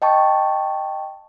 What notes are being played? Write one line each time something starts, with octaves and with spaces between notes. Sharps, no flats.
D#5 G5 A5 C#6